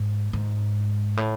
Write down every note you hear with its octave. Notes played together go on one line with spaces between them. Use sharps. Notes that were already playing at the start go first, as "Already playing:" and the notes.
Already playing: G#2
G#2
A2